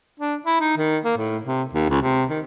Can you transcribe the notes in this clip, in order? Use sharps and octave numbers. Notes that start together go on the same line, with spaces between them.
D4
E4
D#4
D#3
A#3
A2
C3
D#2
C#2
C3
D#3